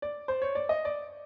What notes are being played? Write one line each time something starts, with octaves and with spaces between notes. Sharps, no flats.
D5
C5
C#5
D5
D#5
D5